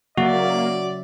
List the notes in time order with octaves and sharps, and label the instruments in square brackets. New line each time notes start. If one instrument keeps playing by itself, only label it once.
[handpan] C#3 F#3 E5 [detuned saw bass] A#3 [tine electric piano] F#4 [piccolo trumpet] D5